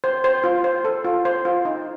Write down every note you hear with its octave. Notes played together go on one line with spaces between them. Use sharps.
C5
C5
F4
C5
A4
F4
C5
F4
D#4